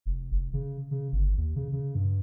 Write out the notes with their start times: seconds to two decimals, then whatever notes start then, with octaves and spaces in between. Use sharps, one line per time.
0.06 F1
0.31 F1
0.53 C#3
0.91 C#3
1.12 G1
1.37 D#2
1.56 C#3
1.72 C#3
1.95 G2